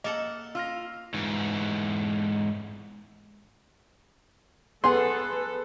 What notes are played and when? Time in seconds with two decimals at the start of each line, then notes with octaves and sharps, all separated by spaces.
0.04 A#3 A4 D#5 F#5
0.55 F4 E6 F6 A#6
1.14 G#2 E3
4.84 B3 G#4 A4 B4 C6